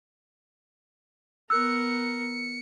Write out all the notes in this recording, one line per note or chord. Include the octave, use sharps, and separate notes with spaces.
B3 A#4 E6 F#6 C#7